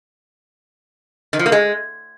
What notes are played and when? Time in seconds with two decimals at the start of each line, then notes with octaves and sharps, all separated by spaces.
1.33 D#3
1.39 F3
1.46 A#3
1.52 G#3